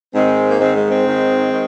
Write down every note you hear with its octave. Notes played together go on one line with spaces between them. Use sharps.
G#2 D#3 G#3 C4
A#3
G#2 D#3 G#3 C4
G#3
G#3 C4
G#2 D#3
D#3